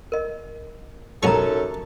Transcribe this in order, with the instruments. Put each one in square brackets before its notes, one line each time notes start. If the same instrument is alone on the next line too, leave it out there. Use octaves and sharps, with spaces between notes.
[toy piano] A#4 D#5
[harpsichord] B1 C#4 C#6 [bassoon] F#2 [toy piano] D#4 G4 A#5 [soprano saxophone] A4